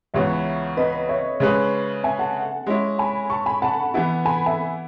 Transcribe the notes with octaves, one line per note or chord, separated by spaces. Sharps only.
C#2 C#3 E3 B3 C#5 E5
B4 D#5
C#5 E5
C#3 G#3 C#4 G#4 B4
E5 G#5
F#5 A5
G#3 C#4 E4
G#5 B5
A5 C#6
G#5 B5
F#5 A5
E3 B3 E4
G#5 B5
E5 G#5